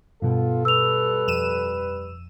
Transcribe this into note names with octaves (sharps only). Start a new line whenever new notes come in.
G2 B2 B3 F4 A4
G3 B4 E6 F7
F2 D#7 E7